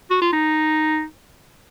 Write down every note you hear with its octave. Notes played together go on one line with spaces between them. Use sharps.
F#4
F4
D#4